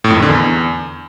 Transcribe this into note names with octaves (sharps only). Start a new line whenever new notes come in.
A2
F2
D#3
D3
E2